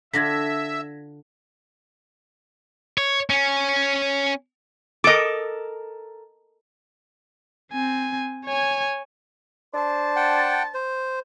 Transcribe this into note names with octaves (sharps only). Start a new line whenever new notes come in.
D3 D4 F4 E5 G#6 A#6 B6
C#5
C#4
A4 A#4 D#5 D6
C4 G#5
C#5 G#5
D4 C5 A5
F#5 G5
C5